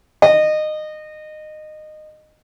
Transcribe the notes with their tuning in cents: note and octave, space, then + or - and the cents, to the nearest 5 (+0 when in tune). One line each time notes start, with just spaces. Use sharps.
D#5 -20